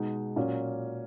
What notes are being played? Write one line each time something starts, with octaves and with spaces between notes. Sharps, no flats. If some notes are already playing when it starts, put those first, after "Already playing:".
Already playing: B2 G#3 D#4
A#2 F#3 A#3 C#4